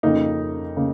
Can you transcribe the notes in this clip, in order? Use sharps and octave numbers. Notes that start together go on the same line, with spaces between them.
F2 C#3 A#3 D#4
C#3 A#3